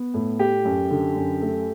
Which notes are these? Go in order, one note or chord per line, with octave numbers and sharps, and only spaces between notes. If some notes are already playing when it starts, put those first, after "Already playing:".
Already playing: B3
A2
A3 G4
F#2
D3
F#2
A3